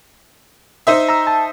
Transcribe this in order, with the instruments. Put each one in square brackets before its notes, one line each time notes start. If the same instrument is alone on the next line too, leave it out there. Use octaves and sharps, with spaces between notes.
[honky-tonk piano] D#4 C5 E5
[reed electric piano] A#5 E6
A5